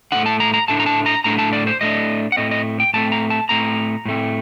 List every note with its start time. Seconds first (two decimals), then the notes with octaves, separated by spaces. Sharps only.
0.12 A2 A3 D4 F#5
0.26 A5
0.40 A#5
0.54 A#5
0.68 A2 A3 D4 A5
0.80 A#5
0.86 A5
1.06 A#5
1.24 A2 A3 D4 A#5
1.39 A5
1.53 D5
1.67 C5
1.81 A2 A3 D4 D#5
2.32 F#5
2.37 A2 A3 C4 D#5
2.51 D#5
2.80 G5
2.94 A2 A3 C4 A5
3.12 A#5
3.30 A5
3.49 A2 A3 C4 A#5
4.06 A2 A3 C4